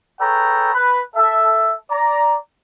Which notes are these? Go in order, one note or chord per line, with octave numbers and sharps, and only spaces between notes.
G#4 A4 B4 C#5 G5 A#5
B4
A4 E5
D5 A#5